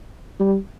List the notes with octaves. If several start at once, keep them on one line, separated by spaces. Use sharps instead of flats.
G3